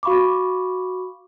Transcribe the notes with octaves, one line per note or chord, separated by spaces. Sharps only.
F#4 F5 B5 C#6 D6